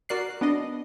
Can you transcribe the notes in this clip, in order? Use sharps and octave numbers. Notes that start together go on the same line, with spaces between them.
F#4 A#4 D5 F#6 C7
B3 D4 D5 D#5